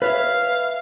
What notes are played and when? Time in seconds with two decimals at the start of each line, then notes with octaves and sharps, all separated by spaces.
0.02 B4 C#5 E5 F5